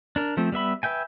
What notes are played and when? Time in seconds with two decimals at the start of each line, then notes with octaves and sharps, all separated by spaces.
0.16 D4 A#4
0.37 F3 A3 C4
0.52 G3 B3 E5 B5
0.83 B4 E5 G5 G#5